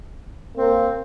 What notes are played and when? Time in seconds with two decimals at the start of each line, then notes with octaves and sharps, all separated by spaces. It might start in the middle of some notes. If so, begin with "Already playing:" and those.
0.57 A#3 C4